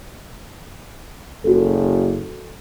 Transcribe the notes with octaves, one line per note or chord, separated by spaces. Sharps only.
F#1 F#4 A4